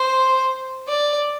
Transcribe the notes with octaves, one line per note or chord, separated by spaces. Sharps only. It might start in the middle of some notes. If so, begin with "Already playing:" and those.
Already playing: C5
D5